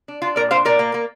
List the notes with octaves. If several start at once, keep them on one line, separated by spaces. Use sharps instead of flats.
D4
D4 F4
A#2 A#4 D5
D4 C5 F5
A#2 A#4 D5
A#3
A#3